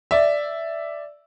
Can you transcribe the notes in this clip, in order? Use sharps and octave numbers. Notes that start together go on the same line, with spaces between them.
D5 E5